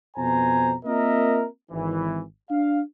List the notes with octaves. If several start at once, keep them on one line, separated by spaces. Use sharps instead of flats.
F2 B2 B3 C5 G#5 A#5
A#3 C4 F4 A#4 D#5 E5
G#1 E3
D4 F5